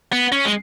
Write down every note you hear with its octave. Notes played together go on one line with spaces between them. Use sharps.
B3
C#4
G#3